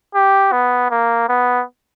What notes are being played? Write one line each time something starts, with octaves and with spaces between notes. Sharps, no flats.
G4
B3
A#3
B3